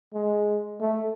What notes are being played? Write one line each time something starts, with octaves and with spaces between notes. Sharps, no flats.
G#3
A3